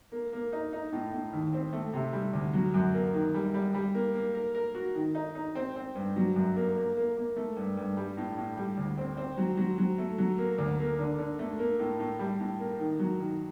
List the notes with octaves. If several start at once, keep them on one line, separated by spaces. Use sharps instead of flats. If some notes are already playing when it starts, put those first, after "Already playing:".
A#3
A#3
D#4
D#4
A2
A2
D#2
C4
A3
C3
G3
D2
F#3
F#2
A#3
D#3
G3
G3
G3
A#3
A#3
A#4
A#4
F#4
D#3
D#4
D#4
C4
C4
G2
F#3
F#2
A#3
A#3
A#3
A#3
A3
G2
G2
G3
A2
A2
G3
D2
C4
C4
F#3
F#3
F#3
A3
F#3
A#3
D2
A#3
D3
D3
A3
A#3
A2
A2
G3
A2
A#3
D#3
F#3
D#3